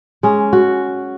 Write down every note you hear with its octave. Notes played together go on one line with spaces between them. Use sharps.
G#3 C#4
F#4